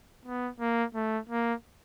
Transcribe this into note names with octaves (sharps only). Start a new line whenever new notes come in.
B3
A#3
A3
A#3